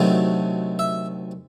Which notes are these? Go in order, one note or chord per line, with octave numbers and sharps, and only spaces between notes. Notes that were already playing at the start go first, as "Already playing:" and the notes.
Already playing: D2 C3 D#3 F#3 A3
E5